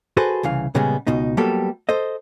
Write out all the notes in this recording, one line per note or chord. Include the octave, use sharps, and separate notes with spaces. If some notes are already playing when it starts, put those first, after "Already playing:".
F#4 G#4 A4 B4 C5
C2 C#3 E3 F5
A#2 C#3 G3 G#3 B3 G#4
C#2 B2 D#4
F#3 G3 A#3 B3 G4 A4
A4 C5 D#5